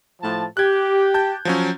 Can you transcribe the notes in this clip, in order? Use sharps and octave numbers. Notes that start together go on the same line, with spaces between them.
A2 F3 A5
G4 F#6 G#6
A5 G6
F3 F#3 C#4